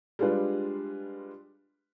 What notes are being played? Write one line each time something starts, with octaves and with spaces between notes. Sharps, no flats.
G3 G#3 D4 F4 B4